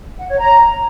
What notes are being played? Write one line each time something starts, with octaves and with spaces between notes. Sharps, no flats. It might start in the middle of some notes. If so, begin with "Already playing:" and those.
F#5
C#5
A#5